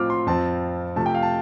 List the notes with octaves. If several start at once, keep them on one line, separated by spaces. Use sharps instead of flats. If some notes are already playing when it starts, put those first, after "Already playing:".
Already playing: A2 F3 C4 F4 D6 F6
C6
F2 F3 C4 F4 A5
C3 F3 A3 A5
G5
F5
A5